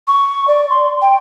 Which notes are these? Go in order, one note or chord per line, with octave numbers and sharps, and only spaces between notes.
C#6
D5
C6
G5